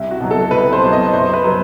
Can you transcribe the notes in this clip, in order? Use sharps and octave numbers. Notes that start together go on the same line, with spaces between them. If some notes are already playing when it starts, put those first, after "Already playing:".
Already playing: C2 E4
F#4
B2 F#3
A4
C2 B4
C5
B2 F#3
D#5
F#2 C5
B4
F#3 B3